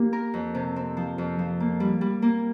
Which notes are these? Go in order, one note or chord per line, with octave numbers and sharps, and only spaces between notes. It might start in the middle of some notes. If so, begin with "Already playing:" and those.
Already playing: A#3 G4
A#4
F2
C3
C4
F3
F2
F3
A#3
G3
G3
A#3